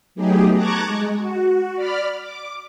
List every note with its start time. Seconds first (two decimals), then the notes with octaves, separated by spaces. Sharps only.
0.15 F#3 A3 B3 D#4 G4 G#4
0.55 A5 A#5 C#6 D6 F#6 G#6
0.85 G#3
1.18 F#4
1.75 D5 B5 F6
2.22 D6